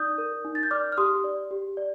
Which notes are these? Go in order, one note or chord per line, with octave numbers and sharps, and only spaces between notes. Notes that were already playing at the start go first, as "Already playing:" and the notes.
Already playing: D#4 D5 D#6 G6
A#4
D#4
A6
G6
D5 D6 F6
F6
G4 C6 D#6
D5
G4
D5